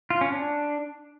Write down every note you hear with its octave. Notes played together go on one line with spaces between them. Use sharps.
F4
C#4
D4